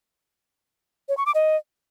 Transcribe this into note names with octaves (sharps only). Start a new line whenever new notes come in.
C#5
C#6
D6
D#5